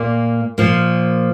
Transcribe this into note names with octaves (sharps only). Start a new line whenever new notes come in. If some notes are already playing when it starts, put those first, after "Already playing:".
Already playing: A#2 A#3 F4 D5
A#2 F3 A#3